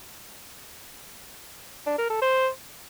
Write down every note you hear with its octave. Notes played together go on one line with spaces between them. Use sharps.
D4
A#4
A4
C5